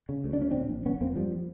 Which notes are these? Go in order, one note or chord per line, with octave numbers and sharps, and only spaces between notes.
C#3
D2
D4
D2 C#4
A#2 C4 D4
A#1
G1 B3 C#4
F2 A#3 C4
G2 F3 G3